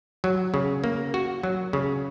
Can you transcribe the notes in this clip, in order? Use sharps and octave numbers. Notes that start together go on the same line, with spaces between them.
F#3
C#3
A#3
F#4
F#3
C#3